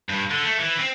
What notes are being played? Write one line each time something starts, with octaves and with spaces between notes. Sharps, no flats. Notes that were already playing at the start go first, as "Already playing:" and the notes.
G2
D3
A3
E3
C4